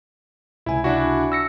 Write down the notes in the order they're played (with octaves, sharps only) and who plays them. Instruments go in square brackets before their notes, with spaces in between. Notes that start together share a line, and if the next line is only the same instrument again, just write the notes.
[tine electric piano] C#2 C3 G#5 [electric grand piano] E4
[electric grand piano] D4 E4 F#4
[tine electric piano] E6 A#6 C#7